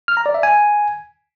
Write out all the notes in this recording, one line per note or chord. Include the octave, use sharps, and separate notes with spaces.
F6
A#5
D5
E5
G#5